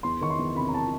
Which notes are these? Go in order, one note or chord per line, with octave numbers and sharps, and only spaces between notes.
E2 C6
D#3 C#6
C6
E2
C3 B5
A#5
A5